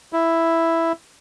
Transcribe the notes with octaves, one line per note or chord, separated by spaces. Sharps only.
E4